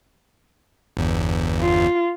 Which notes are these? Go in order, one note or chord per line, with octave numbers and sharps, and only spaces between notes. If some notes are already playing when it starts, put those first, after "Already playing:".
G1 E2
F4